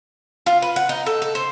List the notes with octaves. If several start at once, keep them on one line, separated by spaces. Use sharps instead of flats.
F4
B4
F#5
D#4
A4
A4
C5